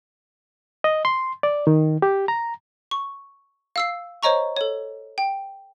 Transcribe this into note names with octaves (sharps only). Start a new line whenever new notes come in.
D#5
C6
D5
D#3
G4
A#5
C#6
F5 E6 C7
C5 C#5 D#5 A#5 C#6
A4 C#5
G5